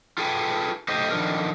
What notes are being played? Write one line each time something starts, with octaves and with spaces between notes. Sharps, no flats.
F4 G#4 A4 B4 G5 G#5
A3 G4 C5 D#5
D3 D#3 F3 D4 A#4